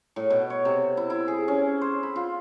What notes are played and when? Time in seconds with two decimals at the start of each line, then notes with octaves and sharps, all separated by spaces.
0.16 A2
0.30 B2
0.50 C#5
0.65 C3
0.97 E4
1.10 E4
1.28 G#4
1.48 C#4
1.81 C5
2.03 B5
2.16 F4